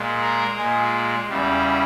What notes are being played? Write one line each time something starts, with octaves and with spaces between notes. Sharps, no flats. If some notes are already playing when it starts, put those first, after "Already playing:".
Already playing: A#2 G#3
A#4
A#2 G#3 G#4
E2 C#3 G3